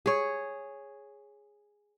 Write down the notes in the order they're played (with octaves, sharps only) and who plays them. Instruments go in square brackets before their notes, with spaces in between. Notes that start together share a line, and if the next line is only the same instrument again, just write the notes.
[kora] G#4 C#5